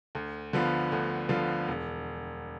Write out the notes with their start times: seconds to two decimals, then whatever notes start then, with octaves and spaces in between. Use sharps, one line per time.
0.15 D2
0.53 D3 F3 B3 F4
0.92 D2
1.29 D3 F3 B3 F4
1.68 E1